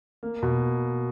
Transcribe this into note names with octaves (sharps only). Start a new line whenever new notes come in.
A#3
B2